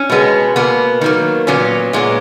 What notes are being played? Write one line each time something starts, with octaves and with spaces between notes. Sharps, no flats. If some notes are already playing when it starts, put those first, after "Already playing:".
Already playing: C#4
B2 G#3 B3
B2 A#3 B3
D#3 F#3 A#3
A#2 F#3 B3 C#4
A#2 G#3 B3